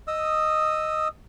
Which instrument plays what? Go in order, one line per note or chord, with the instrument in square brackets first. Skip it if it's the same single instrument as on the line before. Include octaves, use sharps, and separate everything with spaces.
[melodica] D#5 D#6 E6